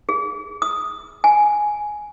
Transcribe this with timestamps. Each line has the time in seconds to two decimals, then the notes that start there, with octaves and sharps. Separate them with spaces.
0.09 G#4
0.62 D#6
1.24 G#5